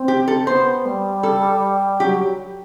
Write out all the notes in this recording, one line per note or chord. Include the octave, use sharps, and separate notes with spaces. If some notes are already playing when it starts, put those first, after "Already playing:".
Already playing: C4
G4
A4
B3 C5
G3
A4
F#3 G4